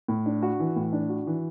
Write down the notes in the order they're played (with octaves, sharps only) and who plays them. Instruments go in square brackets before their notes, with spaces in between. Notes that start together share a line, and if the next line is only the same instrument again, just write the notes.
[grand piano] A2
D4
F#4
E3
A2
D4
F#4
E3